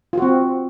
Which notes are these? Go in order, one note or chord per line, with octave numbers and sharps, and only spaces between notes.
C4 F4 F#4